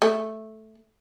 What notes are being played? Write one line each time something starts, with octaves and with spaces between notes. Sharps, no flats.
A3